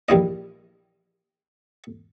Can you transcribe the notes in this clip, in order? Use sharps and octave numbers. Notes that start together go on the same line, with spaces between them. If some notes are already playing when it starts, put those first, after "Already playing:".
A#1 G3 E4 D#5